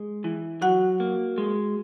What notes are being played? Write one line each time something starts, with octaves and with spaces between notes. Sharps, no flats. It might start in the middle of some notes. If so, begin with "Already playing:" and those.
Already playing: G#3
E3
F#3 F#4 F#5
A#3
G#3